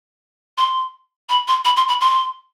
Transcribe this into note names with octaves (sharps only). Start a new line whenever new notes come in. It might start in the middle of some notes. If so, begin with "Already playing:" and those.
C6
B5
C6
B5
C6
B5
C6